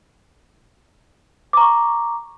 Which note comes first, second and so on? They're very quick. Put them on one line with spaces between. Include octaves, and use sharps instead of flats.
D6 A#5 C#6